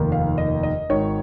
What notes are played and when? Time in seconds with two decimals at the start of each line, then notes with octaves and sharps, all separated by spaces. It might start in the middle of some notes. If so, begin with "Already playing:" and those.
Already playing: F1 D#2 D#3 A#3
0.12 F5
0.38 D#5
0.63 D#5
0.89 G#1 G#2 D#3 C#5